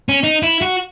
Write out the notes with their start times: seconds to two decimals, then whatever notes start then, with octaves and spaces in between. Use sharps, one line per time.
0.09 C#4
0.24 D#4
0.43 E4
0.62 F#4